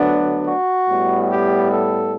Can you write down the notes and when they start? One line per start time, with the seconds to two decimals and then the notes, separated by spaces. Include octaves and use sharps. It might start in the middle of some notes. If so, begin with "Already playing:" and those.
Already playing: D2 D3 F#3 B3 D4
0.46 F#4
0.88 A2 G3 B3
1.29 G4
1.71 A4